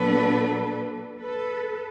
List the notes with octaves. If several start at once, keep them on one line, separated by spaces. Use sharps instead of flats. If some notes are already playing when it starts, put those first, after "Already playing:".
Already playing: A#2 F#3 B3 D4 A4 B4
A4 B4